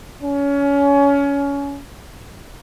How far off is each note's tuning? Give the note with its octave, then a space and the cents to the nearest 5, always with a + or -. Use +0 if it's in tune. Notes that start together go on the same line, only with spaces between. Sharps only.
C#4 +25